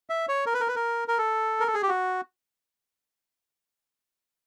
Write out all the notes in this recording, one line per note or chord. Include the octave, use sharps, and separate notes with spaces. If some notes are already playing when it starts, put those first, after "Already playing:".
E5
C#5
A#4
B4
A#4
B4
A#4
A#4
A4
A#4
A4
G#4
G4
F#4